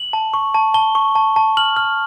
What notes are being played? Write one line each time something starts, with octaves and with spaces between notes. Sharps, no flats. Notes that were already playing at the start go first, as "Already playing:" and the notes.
Already playing: F#7
A5
C#6
A5
A5 G7
C#6
A5
A5
F6 F#7
F6